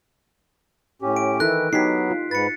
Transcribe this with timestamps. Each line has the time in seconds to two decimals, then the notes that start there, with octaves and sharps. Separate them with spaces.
1.02 A2 C#4 G4
1.16 D7
1.40 D#3 E3 E4 A4 F#6 A#6
1.73 F#3 B3 D#4 G4 G#5 B6 C7
2.10 F4
2.31 G#2 B4 A6 C#7